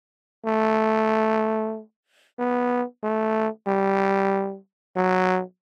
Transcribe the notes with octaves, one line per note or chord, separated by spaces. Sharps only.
A3
B3
A3
G3
F#3